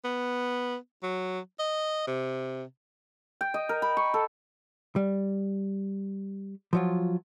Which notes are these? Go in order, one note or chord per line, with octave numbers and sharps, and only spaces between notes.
B3
F#3
D#5
C3
G5
D#5
A#4
B5
C#6
A4
G3
F3 F#3 F4